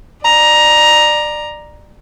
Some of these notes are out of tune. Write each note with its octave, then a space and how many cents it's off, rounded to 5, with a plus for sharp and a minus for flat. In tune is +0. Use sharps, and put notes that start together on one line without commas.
D5 +25 A#5 +10